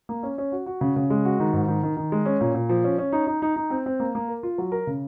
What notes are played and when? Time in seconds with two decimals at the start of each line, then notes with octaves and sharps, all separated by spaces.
0.09 A#3
0.23 C#4
0.38 C#4
0.52 F#4
0.66 F#4
0.81 C#3
0.96 C#3
1.10 G#3
1.25 F#4
1.40 D#3
1.53 G#2
1.68 D#3
1.83 D#3
1.97 D#3
2.12 G#3
2.26 C#4
2.41 A#2
2.54 A#2
2.69 F3
2.84 C#4
2.98 C#4
3.12 D#4
3.27 D#4
3.42 D#4
3.56 D#4
3.70 C4
3.86 C4
4.00 A#3
4.15 A#3
4.28 A#4
4.43 F4
4.58 F#3
4.72 A#4
4.87 C#3